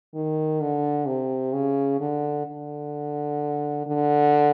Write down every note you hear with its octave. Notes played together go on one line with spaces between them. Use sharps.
D#3
D3
C3
C#3
D3
D3
D3